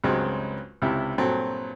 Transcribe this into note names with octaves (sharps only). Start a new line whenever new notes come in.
C#2 G2 F#3 G#3 C4
C#2 C3 E4 G4
G2 A#2 F#3 C4 A4